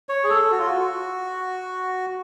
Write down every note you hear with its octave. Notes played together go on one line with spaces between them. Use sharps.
C#5
G#4
A4
F#4
F4
F#4